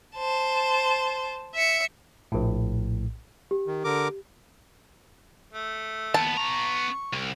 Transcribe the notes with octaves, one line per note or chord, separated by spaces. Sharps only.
C5 A5
E5 C#7
A#1 A2
G4
D#3
D3 A#4 D6
A3
D#2 B3 A5
B3 A#5 C#6
C2